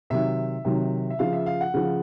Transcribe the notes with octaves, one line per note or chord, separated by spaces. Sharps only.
C3 D#3 F#3 E5
C3 D#3 F#3
E5
C#3 F3 F5
E5
F5
F#5
C#3 F3